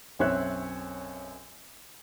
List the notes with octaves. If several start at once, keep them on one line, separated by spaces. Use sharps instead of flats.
B1 F#2 C4 C#5 E5 F#6